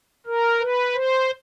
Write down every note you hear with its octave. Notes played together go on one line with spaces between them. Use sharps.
A#4
B4
C5